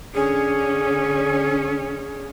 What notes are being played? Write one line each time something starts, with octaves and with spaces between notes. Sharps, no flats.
D3 C#4 G#4